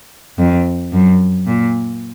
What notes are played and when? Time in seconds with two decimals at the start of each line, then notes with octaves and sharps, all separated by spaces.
0.38 F2
0.92 F#2
1.46 A#2